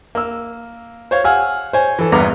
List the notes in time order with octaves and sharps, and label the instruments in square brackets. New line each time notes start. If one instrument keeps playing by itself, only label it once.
[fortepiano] A#3 E6
C5 C#5 F5
F5 F#5 G#5 E6 F6
C5 C#5 G#5
E3 A4
A#1 E2 G2 B3 A#5 D6